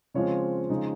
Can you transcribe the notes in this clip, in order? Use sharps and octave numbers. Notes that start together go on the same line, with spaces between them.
C#3 F3 G#3 C4 F4 C#5
C#3 F3 G#3 D#4